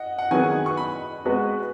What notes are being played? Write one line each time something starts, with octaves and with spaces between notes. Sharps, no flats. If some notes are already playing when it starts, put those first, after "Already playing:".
Already playing: D#5 F#5
F#5
D#3 F#3 B3 G#4 G#5
C#6
B5
G#3 B3 F#4 B4